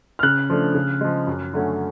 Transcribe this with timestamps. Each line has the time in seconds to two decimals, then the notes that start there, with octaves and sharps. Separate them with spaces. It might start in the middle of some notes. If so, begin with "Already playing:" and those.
0.19 F6
0.23 C#3 F#6
0.50 F3 A3 D4
0.75 C#3
1.01 F3 G#3
1.27 F#2
1.54 D3 F#3 A3 C#4